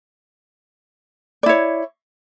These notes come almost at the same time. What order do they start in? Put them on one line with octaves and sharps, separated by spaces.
D5 E4 C#5